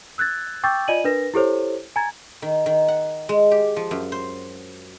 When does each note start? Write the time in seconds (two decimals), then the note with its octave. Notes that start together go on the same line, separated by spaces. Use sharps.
0.18 E6 F#6 G#6 A6
0.63 G5 C#6 D6 E6 G6 A6
0.88 F4 D5 D#5 G#5 D#7 F#7
1.04 D4 A#4 B4 A#6
1.34 E4 G4 A4 C5 C#5
1.96 G#5 A#5 G#6 A6
2.42 D#3
2.66 D#3
2.88 F#5
3.29 G#3
3.51 G4
3.76 F3
3.91 F#2
4.12 C5